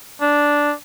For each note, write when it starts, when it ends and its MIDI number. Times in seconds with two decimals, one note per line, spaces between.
0.21 0.72 62